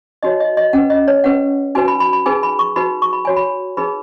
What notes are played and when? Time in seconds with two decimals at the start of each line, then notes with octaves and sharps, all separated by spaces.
0.23 D#4 F#4 C#5 D#5
0.40 D#5
0.57 D#5
0.73 C#4 B4 F#5
0.90 D#5
1.08 C#5
1.24 C#4 B4 F#5
1.75 D#4 F#4 B4 G#5
1.88 B5
2.00 B5
2.13 B5
2.26 D#4 G#4 B4 G#5
2.43 B5
2.59 C#6
2.76 D#4 F#4 B4 B5
3.02 C#6
3.13 B5
3.25 F#4 C#5 G#5
3.37 B5
3.77 D#4 G#4 B4 B5